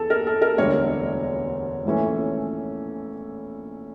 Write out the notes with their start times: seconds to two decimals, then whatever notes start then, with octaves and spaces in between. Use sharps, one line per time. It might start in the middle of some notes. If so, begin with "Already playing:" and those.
Already playing: E2 E3 A4
0.10 A#4
0.27 A4
0.42 A#4
0.58 E1 D2 D3 G3 C#5
1.85 A#1 A2 E3 A3 C#4